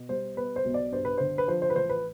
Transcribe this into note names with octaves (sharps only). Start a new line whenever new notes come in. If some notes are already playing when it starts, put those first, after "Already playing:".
Already playing: B2
G3 C5
B3 B4
C5
B1
D5
G2 C5
B4
D3 C5
B4
F3 C5
C5
B4
A1 C5
B4